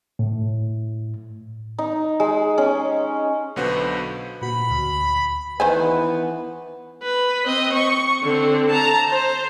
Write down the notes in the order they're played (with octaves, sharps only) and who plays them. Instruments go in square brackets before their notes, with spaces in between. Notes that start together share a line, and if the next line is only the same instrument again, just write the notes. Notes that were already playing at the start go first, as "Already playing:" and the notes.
[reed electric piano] A2
[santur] D#4
G#3
C#4
[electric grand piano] B1 D3 B3 F#4 B4 C5
[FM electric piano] A#2 F#4 [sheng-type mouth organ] B5
[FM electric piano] D2
[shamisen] D#3 C5 G#5 [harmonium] E3 B3 B4
[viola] B4
C4 D#5
C#6
D3 C4
A5 A#5
C5